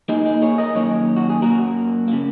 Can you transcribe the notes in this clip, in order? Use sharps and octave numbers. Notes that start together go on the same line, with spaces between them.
A#2 A#3 D#4 G#4
D#4 G#4
G#4 C#5
A#4 D#5
F#2 D#3 A#3 G#4 C#5
F#4
G#4
F#2 F#3 A#3 F#4 A#4
A#3
C#3